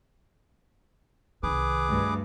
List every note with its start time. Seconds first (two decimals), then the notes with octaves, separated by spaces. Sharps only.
1.43 C2 D#3 G#4 B4 D6
1.87 D2 G2